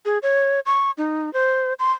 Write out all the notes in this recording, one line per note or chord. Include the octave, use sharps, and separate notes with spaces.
G#4
C#5
C#6
D#4
C5
C6